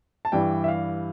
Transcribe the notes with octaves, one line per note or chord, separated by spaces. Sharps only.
A5
G2 E3 G3 G5
E5
F5